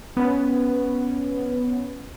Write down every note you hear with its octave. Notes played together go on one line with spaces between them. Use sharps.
B3 C#4